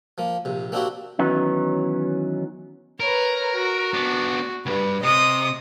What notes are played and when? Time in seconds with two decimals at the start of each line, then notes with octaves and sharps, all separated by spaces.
0.18 F3 A#3
0.45 A#1 C3
0.72 A#3 C4 D4 E4 F#4 G4
1.19 D#3 E3 F#3 B3 C#4 D#4
3.00 A#4 B4 C#5
3.55 F#4
3.94 B3 D4
4.66 C#2 G2 B4
5.03 C3 D#5 D#6